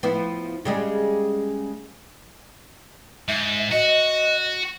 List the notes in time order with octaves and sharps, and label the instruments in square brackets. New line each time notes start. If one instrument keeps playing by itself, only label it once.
[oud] F3 B3 E4
C#3 G3 G#3
[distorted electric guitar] G#2 [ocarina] E5
[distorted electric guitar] F#4 [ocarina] D#5